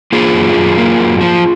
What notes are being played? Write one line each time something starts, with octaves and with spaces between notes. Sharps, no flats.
A#3 F4 G#4
F#2
F#2
A#3
F#2
F3